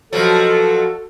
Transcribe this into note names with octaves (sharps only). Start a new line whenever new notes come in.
B2 F3 F#3 F#4 A4